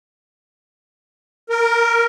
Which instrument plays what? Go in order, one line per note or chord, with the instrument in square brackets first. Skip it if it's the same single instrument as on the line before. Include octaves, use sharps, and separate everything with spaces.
[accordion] A#4